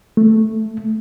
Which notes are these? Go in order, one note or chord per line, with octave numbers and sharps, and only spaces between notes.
A3